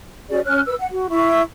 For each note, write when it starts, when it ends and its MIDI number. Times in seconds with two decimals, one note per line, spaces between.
0.29 0.39 61
0.29 0.39 66
0.29 0.39 68
0.29 0.39 74
0.45 0.60 61
0.45 0.60 73
0.45 0.60 89
0.45 0.60 90
0.67 0.74 71
0.67 0.74 88
0.78 0.87 78
0.91 1.06 66
1.10 1.41 64
1.10 1.41 85